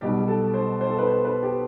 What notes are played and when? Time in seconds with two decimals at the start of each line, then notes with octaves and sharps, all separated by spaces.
0.01 B1 B2 G3 G4
0.20 G4
0.28 A4
0.54 C5
0.81 C5
0.90 A4
0.98 B4
1.07 C5
1.25 B4
1.43 G4